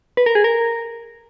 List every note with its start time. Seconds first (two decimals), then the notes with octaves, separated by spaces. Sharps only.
0.17 B4
0.26 A#4
0.35 G#4
0.44 A#4